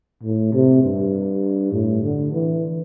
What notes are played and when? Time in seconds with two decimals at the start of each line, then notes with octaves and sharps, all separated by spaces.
0.23 A2
0.53 C3
0.83 G2
1.72 A2
2.03 D3
2.32 E3